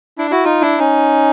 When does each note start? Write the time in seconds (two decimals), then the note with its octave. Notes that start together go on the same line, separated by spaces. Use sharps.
0.18 D4 E4
0.31 E4 F#4
0.44 D#4 F4
0.61 D4 E4
0.79 C#4 D#4